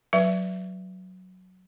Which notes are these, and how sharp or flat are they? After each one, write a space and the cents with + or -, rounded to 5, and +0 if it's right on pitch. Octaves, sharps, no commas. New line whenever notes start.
F#3 +0 B4 +0 E5 +20